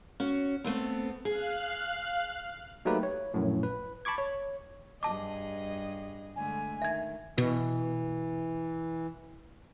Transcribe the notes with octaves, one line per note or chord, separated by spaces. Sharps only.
C#4 F#4 C#5
A3 B3 C4
G#4 F5 F#6
F#3 A3 A#3 D#4 G4 B4
C#5
A#1 F#2 A2
B4
A5 B5 C#6 D6 G#6
C#5
G2 G#4 D#5 A5 D6
D3 G#3 A3 G#5
D#3 E5 G#6
B2 E3